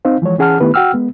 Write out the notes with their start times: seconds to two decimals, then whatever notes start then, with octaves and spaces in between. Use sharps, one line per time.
0.05 C4 D#4 C5 F5
0.22 E3 F3 G#3 C#5
0.38 E3 C#4 G#4 F#5 A5 F6
0.60 D#3 A3 B3 E4 G4 B4
0.74 F#4 F#5 G5 E6 F6
0.93 G#3 B3